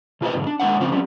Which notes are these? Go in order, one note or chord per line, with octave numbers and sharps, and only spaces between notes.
B2 F4 B4 C5 D#5
B1 G#2 D3
D4
G#3 C#4 D4 C#5 F#5
C#3 F3 C4 F4 C5
F#3 G3 C4 C#4